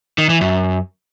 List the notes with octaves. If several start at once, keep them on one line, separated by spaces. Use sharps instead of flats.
D#3
E3
F#2